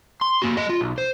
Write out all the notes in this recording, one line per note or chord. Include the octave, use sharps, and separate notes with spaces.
C6
A#3 F#4
A3 D#5
F4
B1
C5